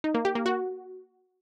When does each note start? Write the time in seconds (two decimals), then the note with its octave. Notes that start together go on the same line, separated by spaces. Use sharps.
0.04 D#4
0.15 A#3
0.25 G4
0.35 A#3
0.46 F#4